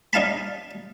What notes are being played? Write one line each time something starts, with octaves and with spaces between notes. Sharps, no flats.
D4 D#4 F5 A5 B5